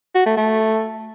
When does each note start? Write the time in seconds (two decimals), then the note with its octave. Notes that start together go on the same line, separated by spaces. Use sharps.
0.15 F#4
0.26 A3
0.37 A3